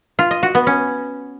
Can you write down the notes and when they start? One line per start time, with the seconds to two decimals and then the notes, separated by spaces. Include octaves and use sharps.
0.19 F4
0.31 D#5
0.43 F#4
0.55 B3
0.67 C#4